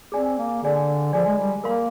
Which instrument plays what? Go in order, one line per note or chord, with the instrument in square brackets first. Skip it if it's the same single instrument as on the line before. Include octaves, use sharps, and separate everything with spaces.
[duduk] C4 [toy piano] G#4 D5 G#5
[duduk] A#3
[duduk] D3 [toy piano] G#4 D5 G#5
[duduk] F3 [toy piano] G#4 D5 G#5
[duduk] G#3
G3
[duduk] A#3 [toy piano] A#4 F5 C6